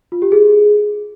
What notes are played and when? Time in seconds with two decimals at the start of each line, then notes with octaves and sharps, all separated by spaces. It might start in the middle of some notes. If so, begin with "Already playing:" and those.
0.12 F4
0.22 G4
0.32 G#4